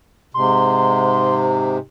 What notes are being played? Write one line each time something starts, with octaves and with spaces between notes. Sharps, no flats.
G#2 C3 C6